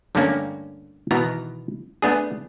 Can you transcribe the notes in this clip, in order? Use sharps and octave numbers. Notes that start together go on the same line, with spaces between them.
G2 D3 G3 A3 A#3 C#4
B2 D#3 E3 B3 A#5
A3 B3 D4 G#4